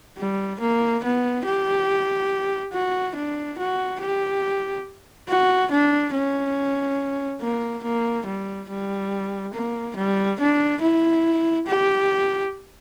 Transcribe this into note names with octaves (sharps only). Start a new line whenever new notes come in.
G3
A#3
B3
G4
F#4
D4
F#4
G4
F#4
D4
C#4
A#3
A#3
G3
G3
A#3
G3
D4
E4
G4